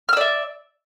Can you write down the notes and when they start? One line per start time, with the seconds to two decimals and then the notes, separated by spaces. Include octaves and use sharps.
0.09 F6
0.13 E6
0.17 D5
0.21 E5